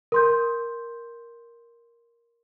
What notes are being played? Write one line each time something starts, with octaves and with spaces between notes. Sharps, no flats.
A#4 C6 G6